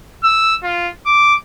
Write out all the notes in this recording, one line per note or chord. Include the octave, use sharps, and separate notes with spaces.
E6
F4
D6